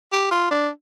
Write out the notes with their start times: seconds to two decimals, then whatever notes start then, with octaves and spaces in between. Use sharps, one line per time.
0.12 G4
0.31 F4
0.51 D4